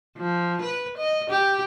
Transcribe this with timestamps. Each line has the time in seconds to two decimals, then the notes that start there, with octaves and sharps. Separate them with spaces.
0.17 F3
0.62 B4
0.98 D#5
1.30 G4